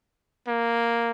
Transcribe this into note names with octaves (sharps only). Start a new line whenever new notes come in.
A#3